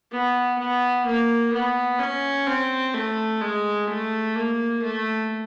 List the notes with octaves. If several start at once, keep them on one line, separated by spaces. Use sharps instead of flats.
B3
B3
A#3
B3
C#4
C4
A3
G#3
A3
A#3
A3